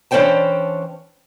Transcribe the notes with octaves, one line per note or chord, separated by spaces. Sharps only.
E3 C#4 D4 C5 G5 A5